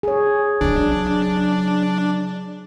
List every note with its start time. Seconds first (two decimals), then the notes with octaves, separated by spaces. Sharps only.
0.03 G#4 C#5
0.61 C#3 F#3 D4